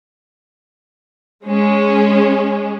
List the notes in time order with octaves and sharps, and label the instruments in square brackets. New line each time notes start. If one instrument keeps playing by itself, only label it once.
[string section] G#3 C#4